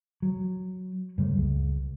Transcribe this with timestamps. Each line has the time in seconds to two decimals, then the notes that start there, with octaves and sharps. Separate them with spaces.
0.22 F#3
1.18 F#2 C#3 G3 A3
1.38 C#2